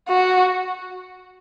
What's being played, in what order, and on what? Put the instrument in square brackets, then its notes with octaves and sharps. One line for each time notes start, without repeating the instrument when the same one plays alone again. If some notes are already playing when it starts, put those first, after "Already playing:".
[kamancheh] F#4